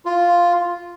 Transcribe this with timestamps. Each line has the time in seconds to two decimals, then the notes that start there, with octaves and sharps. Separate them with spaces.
0.05 F4